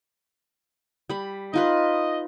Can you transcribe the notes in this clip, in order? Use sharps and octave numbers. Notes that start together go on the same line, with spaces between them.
G3 B5
D#4 F4 B4 D#5